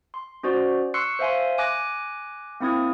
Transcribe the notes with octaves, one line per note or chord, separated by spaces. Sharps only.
C6
C#4 F#4 C5 D5
C6 C#6 E6 F#6 C7 C#7
C5 E5 F5 G#5 C6
G#5 D6 F#6 A#6
A#3 C4 E4 D#6 G#6